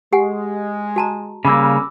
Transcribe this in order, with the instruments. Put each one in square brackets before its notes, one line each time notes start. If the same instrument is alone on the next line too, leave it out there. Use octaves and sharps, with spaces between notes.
[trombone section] G#3 [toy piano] G4 F#5 G#5
[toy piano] F#4 A5 A#5
[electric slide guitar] C#3 G3 A#3 [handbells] B5 D6 E6